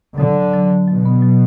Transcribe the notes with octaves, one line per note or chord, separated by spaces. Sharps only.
D3 F#3
F#3
F#3
F#3
B2 F#3
B3
F#3